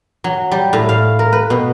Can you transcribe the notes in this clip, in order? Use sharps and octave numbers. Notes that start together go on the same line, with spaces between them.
F#3
G3
A2
F5
A#4
B4
B2